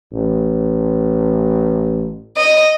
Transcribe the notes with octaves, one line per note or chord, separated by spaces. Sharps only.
A1
D#5